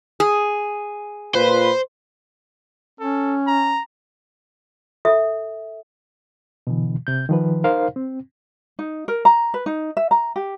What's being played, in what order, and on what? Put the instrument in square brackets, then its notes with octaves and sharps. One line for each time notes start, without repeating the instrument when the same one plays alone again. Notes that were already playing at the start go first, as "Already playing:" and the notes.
[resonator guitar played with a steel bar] G#4
[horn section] A#2 F4 B4 [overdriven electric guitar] C5
[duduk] C#4 [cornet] A4
[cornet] A#5
[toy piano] A4 E5
[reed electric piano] B2 D3 E3
C3 G6
D#3 F3 B4
D#4 A#4 C5 F5
C4
[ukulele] D#4
A#4
A#5
B4
D#4
E5
A#5
G4